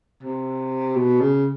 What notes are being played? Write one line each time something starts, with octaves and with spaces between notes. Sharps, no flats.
C3
B2
C#3